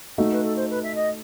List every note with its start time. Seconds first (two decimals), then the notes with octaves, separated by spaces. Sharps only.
0.17 A3 D#4 F#4 A4
0.31 B4
0.44 A4
0.56 C5
0.70 B4
0.83 E5
0.95 D#5